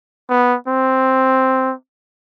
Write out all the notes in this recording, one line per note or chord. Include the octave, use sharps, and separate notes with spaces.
B3
C4